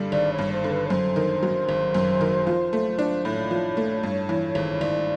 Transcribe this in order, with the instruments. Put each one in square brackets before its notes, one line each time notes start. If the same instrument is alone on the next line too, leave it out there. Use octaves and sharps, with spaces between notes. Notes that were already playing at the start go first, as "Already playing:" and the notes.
Already playing: [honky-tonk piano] G2 D3 G3
[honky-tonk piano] G#1 [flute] D5
[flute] C#5
[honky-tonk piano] G2
[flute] C5
[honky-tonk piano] D3
[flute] B4
C#5
[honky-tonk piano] F#2 [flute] C5
[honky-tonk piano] D#3
F#3
G#1
F#2
D#3
F3
A3
D4
[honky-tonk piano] A2 [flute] C#5
[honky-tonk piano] F3
A3
G2
E3
G#1
[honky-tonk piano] G#1 [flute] D5